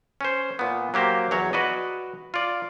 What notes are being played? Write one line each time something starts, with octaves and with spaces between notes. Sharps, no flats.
C#4 C5
A#2 B3
F#3 A#3 G4 C5
E2 F#3 C#5
F#4 B4 D5 D#5
F4 D5